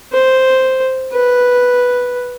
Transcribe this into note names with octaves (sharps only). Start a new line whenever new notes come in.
C5
B4